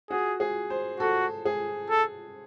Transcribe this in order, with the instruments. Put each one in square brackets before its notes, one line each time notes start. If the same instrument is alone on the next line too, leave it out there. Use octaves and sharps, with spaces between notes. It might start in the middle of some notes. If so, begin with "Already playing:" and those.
[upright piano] F#4 [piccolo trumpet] G#4
[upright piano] G#4
C5
[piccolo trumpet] F#4 [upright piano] A4
[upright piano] G#4
[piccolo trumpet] A4